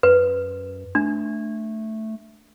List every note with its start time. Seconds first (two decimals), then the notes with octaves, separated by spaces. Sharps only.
0.03 F#2 B4
0.95 A3 D4